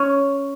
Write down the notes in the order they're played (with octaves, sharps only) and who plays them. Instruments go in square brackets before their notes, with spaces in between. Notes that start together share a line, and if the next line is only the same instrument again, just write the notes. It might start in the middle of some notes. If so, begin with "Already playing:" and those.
Already playing: [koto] C#4